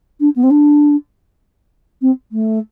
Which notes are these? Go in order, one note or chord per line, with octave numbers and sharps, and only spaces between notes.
D4
B3
C4
D4
C4
A3